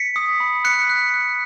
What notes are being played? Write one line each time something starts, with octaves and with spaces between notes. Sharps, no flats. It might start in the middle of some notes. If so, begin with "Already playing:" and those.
Already playing: B6 C#7
D#6
B5
F#6 B6 C#7
F#6
F#6